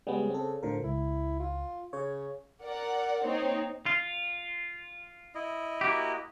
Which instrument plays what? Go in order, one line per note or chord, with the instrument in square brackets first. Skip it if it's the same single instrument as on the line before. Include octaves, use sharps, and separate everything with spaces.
[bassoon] C#3 [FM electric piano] G3 G#3 B3
[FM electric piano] C4 A4
[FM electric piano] A2 D3 A#4 [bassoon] F3
[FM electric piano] C#2 [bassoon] E4
[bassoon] F4
[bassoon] C#3 [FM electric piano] C#5
[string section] A#4 D5 F#5
A#3 C4 D#4 C#5
[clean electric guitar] F4
[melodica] E4 D#5
[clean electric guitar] A#3 F#4 G4